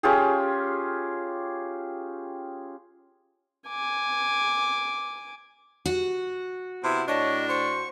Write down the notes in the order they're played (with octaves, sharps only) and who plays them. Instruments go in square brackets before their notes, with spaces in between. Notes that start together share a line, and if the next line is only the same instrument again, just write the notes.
[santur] C#4 F4 G4 G#4
[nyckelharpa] G#5 D6
[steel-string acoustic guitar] F#4
[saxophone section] C3 E4 [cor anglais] B3
[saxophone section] A2 D4 [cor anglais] C#5 [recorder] D#5
[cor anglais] C5 [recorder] C#6